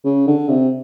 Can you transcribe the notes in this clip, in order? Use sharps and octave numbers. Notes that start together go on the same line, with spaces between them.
C#3
D3
C3